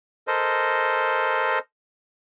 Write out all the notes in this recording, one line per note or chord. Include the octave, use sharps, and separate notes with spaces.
A4 A#4 C5 D#5